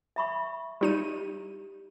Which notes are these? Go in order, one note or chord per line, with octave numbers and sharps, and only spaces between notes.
E5 B5 C#6
G3 D#4 G4 D#7